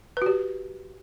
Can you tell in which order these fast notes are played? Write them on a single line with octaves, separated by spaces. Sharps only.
B4 F#4 G4